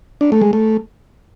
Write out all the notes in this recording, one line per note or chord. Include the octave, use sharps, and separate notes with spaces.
D4
A3
G#3
A3